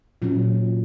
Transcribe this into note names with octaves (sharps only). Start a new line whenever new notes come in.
A#2 F#3 C#4